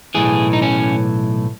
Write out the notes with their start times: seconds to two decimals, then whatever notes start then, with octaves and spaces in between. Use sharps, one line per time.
0.15 B1 A2 E3 G#4
0.53 D#4
0.62 C#4